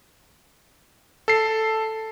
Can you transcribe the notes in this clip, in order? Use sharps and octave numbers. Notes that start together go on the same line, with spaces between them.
A4 C7